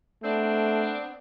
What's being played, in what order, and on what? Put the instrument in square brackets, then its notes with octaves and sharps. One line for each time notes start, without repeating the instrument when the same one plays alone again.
[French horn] A3 [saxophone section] B3 C4 D4